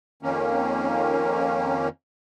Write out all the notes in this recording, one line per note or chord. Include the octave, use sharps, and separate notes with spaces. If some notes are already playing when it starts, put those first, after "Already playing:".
F2 D#3 A#3 C#4